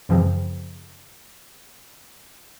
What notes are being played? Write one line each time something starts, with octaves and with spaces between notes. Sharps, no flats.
F#2 C#3 E3 F3 C4